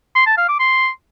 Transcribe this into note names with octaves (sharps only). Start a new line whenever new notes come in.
C6
A5
F5
D6
C6